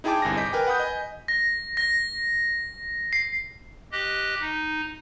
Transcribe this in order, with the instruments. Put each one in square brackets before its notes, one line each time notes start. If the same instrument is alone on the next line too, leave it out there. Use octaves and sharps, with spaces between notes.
[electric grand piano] D#4 E4 G#4 G5 A5 D6
G1 C2 G#5 A#6
D#5 D6 G6 B6
A#4 B4 G5 G#5
B4 F#5 B5 D#6 G6
D#5 G#5
[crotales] A#6
A#6
C7
[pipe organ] G4 D#5 F#6
D#4